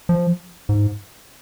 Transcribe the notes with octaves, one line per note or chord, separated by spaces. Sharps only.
F3
G#2